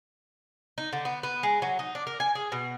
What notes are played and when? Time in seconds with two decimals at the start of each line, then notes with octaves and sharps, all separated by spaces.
0.78 D#4
0.93 D3
1.05 B3
1.23 B3
1.43 G#3
1.62 F#3
1.79 D#4
1.95 D4
2.07 A#4
2.20 G#5
2.35 G#4
2.52 B2